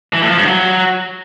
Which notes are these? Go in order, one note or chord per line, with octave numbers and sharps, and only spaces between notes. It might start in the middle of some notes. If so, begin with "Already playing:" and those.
E3
A2
F3
G2
F#3